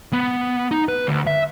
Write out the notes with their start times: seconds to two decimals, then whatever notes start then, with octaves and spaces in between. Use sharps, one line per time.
0.13 B3
0.71 D#4
0.89 B4
1.07 D2
1.27 E5